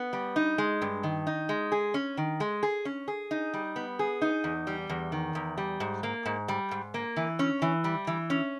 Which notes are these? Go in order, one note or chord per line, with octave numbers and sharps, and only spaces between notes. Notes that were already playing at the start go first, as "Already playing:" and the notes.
Already playing: B3
G3
D#4
G#3
G2
D#3
D#4
G#3
G#4
C#4
D#3
G#3
G#4
C#4
G#4
D#4
G3
B3
G#4
D#4
E2
G3
E2
D#3
E2
G3
G#2
A#3
G#2
G3
G#2
A#3
E3
C#4
E3
G3
E3
C#4